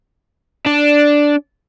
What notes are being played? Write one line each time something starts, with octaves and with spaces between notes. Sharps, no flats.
D4